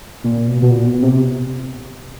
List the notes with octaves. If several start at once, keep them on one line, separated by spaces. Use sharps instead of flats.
A#2
B2
B2
A#2
B2
C3